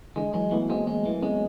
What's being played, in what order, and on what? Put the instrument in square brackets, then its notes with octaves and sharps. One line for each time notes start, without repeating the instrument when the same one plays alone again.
[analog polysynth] D3 E3 [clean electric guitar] G#3
[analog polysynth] E3 F#3 [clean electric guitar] G#3
[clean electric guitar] E3 [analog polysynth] A3 B3
[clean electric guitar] G#3 [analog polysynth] A#3 C4
[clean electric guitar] G#3
E3
[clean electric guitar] G#3 [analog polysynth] B3 C#4